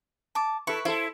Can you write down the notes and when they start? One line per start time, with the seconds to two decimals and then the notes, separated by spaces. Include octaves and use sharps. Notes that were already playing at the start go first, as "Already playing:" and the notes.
0.35 A5 D6
0.67 E4 A4 B4 C#6
0.85 E4 A4 C5